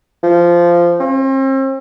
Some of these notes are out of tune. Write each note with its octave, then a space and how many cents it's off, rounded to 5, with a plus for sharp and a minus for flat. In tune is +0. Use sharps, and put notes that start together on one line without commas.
F3 -15
C4 +40